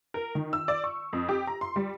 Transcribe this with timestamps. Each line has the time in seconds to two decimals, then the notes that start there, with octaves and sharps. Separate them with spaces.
0.14 A#4
0.35 D#3
0.53 E6
0.68 D5
0.84 C#6
1.13 F2
1.29 G4
1.47 A#5
1.61 C6
1.76 G3